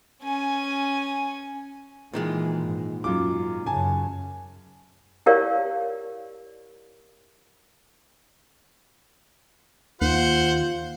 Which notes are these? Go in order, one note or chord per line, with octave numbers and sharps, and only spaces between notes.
C#4 G#5
A#2 D#3 E3 G#3
G#2
F#2 F4 D6
F#2 C#3 G#5 A5
E4 G4 A#4 C#5 D5 F5
D#2 F4 C5 F#5